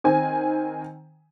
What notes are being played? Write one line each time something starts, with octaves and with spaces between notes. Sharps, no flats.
D#3 C4 G#5